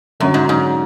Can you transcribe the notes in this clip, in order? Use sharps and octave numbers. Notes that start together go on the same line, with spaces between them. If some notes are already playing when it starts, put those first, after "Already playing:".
F#2 D3 F#3 C#4
G#2
G#2